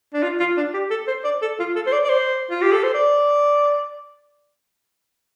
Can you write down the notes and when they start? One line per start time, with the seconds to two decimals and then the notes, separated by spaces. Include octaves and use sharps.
0.14 D4
0.23 F4
0.40 F4
0.57 D4
0.74 G4
0.91 A4
1.08 C5
1.24 D5
1.42 A4
1.59 F4
1.76 A4
1.87 C5
1.92 D5
2.05 D5
2.09 C5
2.50 F4
2.62 G4
2.73 A4
2.83 C5
2.94 D5